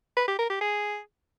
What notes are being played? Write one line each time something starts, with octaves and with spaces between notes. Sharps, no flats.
B4
G4
A#4
G4
G#4